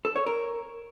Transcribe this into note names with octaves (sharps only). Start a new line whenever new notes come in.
A4
C#5
A#4